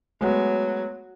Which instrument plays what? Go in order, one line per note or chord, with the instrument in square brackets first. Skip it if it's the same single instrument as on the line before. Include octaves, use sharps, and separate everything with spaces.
[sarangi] F#3 [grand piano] G#3 A3 B3